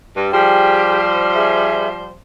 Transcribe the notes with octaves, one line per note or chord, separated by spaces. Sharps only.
G2
F3 G3 G4 G#4 C5 G5
G#4 E5